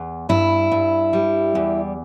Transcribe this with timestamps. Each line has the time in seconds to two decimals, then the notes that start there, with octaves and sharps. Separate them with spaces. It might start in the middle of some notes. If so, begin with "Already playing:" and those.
Already playing: E2
0.29 G2 E4
0.72 G2
1.13 G3
1.55 E2